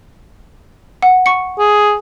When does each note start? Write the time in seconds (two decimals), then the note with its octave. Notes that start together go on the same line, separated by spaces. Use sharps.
1.02 F#5
1.26 C#6 C#7
1.59 G#4